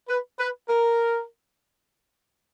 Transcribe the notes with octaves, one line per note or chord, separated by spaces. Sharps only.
B4
B4
A#4